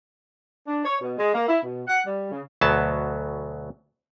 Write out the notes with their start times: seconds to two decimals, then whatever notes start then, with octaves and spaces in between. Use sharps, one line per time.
0.67 D4
0.85 C#5
1.01 B2
1.18 G#3
1.34 A#3
1.48 E4
1.63 B2
1.88 F#5
2.07 G3
2.32 C#3
2.61 D2 B2 F#3 B3 A5